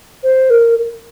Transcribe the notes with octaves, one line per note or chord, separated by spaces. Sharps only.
C5
A#4